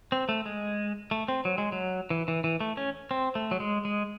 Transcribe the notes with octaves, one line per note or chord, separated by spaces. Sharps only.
C4
A3
G#3
A3
C4
F#3
G#3
F#3
E3
E3
E3
A3
C#4
C4
A3
F#3
G#3
G#3